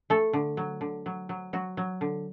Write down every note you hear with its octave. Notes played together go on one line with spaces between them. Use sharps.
A3 A4
D3
F#3
D3
F#3
F#3
F#3 F#4
F#3
D3